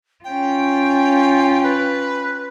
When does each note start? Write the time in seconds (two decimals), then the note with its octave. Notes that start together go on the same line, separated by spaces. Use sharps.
0.24 C#4 F4 G5
1.63 B4